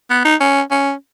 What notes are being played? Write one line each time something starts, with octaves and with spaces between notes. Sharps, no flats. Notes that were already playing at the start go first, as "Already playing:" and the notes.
B3
D#4
C#4
C#4